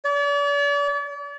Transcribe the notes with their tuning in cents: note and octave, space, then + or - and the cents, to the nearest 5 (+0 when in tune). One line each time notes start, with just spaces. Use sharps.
D5 -40